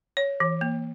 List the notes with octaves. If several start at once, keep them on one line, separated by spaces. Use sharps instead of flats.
C#5
E3
A#3